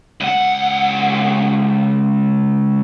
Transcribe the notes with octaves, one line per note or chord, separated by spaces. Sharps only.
C#2 F#5